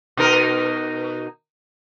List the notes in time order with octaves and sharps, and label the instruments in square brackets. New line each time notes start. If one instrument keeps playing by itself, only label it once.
[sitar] B2 D#4 A#4